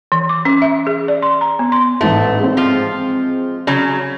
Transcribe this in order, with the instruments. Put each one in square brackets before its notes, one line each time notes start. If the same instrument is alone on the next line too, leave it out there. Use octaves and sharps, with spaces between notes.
[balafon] E3
D6
C#4
E5
G#4
D5
C6
A#5
B3
C6
[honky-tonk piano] A1 G#2 [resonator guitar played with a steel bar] A3
[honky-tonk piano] G#3 C4
[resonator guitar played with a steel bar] F3 F4
C#3 F#3